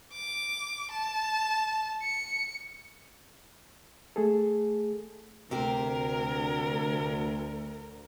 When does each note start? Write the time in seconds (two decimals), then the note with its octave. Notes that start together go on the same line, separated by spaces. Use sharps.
0.13 D6
0.91 A5
2.02 C#7
4.16 A3 G#4 A4
5.51 D2 C3 G4 A#4 C5